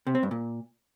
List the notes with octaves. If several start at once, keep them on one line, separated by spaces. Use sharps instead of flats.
C3
C4
G2
A#2